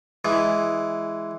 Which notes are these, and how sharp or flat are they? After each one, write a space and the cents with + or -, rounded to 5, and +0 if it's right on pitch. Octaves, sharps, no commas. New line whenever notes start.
E3 +0 G#3 +0